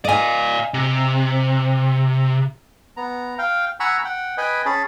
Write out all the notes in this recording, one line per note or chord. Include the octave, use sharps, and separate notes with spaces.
D5 D#5 F5 G#5
C3
B3 A#5
F5 G5
F#5 G#5 A#5 B5 C#6 E6
F#5 G5
B4 D#5 G5 G#5 B5
C#4 G#4 A5 B5